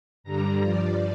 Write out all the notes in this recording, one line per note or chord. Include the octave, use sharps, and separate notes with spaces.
G2 D3 G3 A#5
G2 F3 D5